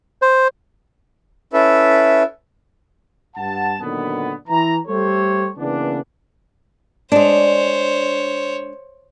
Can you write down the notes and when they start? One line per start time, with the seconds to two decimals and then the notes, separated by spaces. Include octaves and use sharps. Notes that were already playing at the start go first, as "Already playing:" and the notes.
0.22 C5
1.53 C#4 E4 A4 B4 E5
3.36 G2 F#5 A5
3.81 A#2 D3 D#3 F#3 B3
4.48 E3 A#5
4.87 G3 A3 G4 A4 C5 C#5
5.58 C#3 E3 A#3 B3 D4
7.12 G#3 D4 C5 C#5